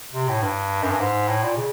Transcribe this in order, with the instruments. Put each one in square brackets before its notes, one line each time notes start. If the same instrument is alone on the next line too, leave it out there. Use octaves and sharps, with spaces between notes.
[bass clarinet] C3
A2
G2
F#2
G2
G#2
A2
A#2
C#3